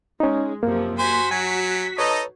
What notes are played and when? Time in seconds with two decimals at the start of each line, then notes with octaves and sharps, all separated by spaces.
0.20 G#3 C#4 D#4
0.63 F#2 C3 F3 A#3
0.99 F#4 C5 G#5 B6
1.31 F#3 G#5
1.98 D#4 A4 B4 C#5 D#5